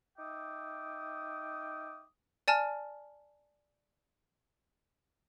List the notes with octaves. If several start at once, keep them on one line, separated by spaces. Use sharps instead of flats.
D#4 E5 G5 D6 D#6
D5 G#5 A5 F6